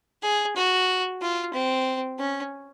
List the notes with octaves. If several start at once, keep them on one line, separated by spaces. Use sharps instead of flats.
G#4
F#4
F4
C4
C#4